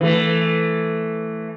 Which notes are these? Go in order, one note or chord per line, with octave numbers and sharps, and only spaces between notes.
E3 A3